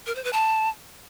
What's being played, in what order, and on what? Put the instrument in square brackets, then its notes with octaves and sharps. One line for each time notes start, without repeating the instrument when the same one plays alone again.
[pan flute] A#4
C5
B4
A5